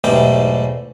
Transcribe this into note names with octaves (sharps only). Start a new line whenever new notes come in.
B1 E2 G#2 G3 A3 G5